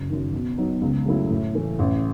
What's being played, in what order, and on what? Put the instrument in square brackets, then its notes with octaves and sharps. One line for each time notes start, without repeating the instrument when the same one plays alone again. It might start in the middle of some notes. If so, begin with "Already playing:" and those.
Already playing: [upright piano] F#1
F#2 D#3
B2
F#3 B3 D#4
C#2
C#3 F#3 A3 E4
A2
E3 A3
A1